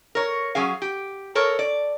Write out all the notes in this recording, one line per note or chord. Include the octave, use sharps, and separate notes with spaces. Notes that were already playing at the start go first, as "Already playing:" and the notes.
A#4 C#5
F#3 C#4 G#4 F5
G4
A4 A#4 C#5
D5